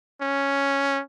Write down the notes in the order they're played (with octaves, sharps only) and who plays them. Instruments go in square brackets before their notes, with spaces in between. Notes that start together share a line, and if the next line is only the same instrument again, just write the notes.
[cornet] C#4